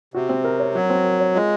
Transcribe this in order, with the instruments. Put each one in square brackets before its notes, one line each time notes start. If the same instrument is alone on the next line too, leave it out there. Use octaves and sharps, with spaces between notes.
[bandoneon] C3 [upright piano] F#4
[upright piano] C4
A#4
C#5
[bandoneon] F#3 [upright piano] F#4
[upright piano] C4
A#4
C#5
[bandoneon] G#3 [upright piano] F4